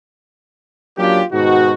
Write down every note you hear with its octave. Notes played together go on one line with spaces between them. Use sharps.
F#3 A#3 C#4 D4 F4 G4
G#2 B2 D#3 D#4 F#4